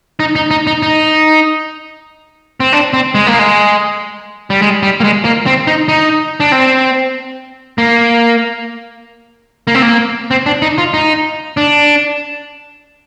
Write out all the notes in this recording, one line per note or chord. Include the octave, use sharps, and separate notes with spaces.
D#4
D#4
D#4
D#4
D#4
C4
D4
C4
G#3
A#3
G#3
G3
G#3
G3
A#3
G#3
A#3
C4
D#4
D#4
D4
C4
A#3
A#3
C4
A#3
C4
D4
D#4
F4
D#4
D4